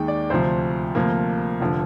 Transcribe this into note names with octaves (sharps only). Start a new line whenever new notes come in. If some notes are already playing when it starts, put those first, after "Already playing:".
Already playing: D#2 D#3 G#3 G5
D5
D2 C3 F3 C5
D2 C3 F3 A#3
F1 D3 F3